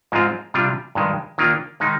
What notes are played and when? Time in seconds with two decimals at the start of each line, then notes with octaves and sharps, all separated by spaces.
0.12 G#2 F3 G#3 C4 F4
0.54 C3 G3 D4 F4
0.95 G2 D#3 G#3
1.38 D#3 A#3 D4 F4
1.80 D#3 G#3 D#4